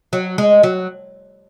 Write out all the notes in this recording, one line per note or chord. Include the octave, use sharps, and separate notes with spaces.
F#3
G#3
F#3